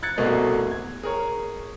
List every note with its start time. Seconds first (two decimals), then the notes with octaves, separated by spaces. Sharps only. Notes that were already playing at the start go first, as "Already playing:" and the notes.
0.03 F#6 G#6 A6 C#7
0.17 F1 C2 B2 A3 A#3 D#5
0.71 G#6
1.03 G#4 A#4 C#5